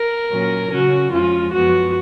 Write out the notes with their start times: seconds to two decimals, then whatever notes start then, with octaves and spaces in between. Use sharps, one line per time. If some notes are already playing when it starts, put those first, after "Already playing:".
Already playing: A#4
0.30 A#2 F#3 C#4
0.71 C#3 F#3 C#4 F#4
1.11 F2 F3 G#3 C#4 F4
1.53 F#2 F3 B3 F#4